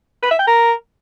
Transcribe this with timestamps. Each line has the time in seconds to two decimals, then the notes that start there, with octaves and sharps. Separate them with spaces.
0.23 B4
0.31 E5
0.39 G5
0.47 A#4